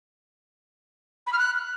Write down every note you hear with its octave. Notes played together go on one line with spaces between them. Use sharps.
B5
F6
F#6